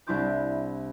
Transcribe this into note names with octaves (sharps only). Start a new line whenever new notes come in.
C2 D4 E4 C6 D6 G6